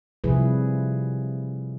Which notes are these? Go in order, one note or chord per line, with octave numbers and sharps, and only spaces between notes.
C3 F3 G3 E4 G#4 B4